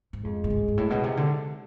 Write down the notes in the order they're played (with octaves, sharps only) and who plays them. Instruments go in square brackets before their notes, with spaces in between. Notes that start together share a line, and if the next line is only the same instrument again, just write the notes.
[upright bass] G#2
[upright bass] F2 [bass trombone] G#3
[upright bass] A2
G#2
G#2
A2
B2
C3
D3